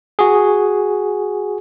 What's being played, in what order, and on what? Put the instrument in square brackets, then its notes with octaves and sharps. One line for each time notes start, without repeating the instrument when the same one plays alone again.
[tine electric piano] F#4 G#4